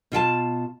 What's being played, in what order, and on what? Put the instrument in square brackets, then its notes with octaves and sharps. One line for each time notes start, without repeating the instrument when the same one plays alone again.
[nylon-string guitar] B2 F4 G5 A5